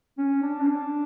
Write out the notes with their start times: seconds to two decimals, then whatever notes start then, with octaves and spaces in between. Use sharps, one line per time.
0.18 C#4
0.42 D4
0.61 C#4
0.67 D4